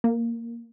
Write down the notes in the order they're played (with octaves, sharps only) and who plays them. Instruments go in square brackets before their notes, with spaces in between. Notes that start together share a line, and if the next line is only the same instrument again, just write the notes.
[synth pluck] A#3